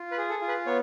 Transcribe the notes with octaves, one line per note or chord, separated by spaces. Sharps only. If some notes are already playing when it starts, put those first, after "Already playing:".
Already playing: F4
B4
G#4
A4
F4
B4
B3 C#5